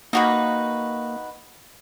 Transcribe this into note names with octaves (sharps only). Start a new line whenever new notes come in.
A#3 D#4 F#4 B4